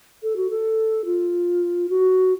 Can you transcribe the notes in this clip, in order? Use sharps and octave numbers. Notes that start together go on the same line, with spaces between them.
A4
F#4
A4
F4
F#4